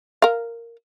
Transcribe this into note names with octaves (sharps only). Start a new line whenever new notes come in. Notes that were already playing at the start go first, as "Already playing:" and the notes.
A#4 F5